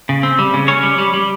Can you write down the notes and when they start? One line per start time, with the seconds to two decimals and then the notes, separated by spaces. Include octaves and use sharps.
0.09 C#3
0.23 C4
0.39 G3
0.54 C#3
0.68 C#4 C#5
0.83 G3
0.98 G3
1.14 G3